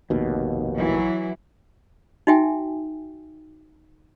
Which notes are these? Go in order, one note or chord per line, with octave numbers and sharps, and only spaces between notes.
F1 A#1 D#2 B2
E3 F#3 E4
D#4 F#4 E5 G5 G#5